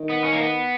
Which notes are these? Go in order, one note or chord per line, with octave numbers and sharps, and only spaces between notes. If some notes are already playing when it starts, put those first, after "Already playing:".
Already playing: D#3
B3
C#4
A#3
B3